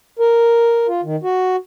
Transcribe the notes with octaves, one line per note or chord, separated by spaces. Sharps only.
A#4
F4
D#3
F#4